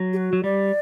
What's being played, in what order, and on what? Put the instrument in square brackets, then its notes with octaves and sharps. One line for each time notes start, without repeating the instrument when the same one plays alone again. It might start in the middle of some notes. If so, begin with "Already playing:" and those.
Already playing: [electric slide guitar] F#3
[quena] G4
F#4
[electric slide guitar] F#3
[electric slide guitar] G3 [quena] D5